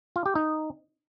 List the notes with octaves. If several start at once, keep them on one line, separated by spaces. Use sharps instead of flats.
F4
G4
D#4